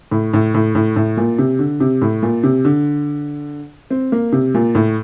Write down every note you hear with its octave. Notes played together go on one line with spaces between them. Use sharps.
A2
A2
A2
A2
A2
A#2
C3
D3
C3
A2
A#2
C3
D3
C4
A#3
C3
A#2
A2